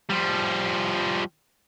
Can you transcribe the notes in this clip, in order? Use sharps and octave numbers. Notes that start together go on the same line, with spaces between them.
F3 G3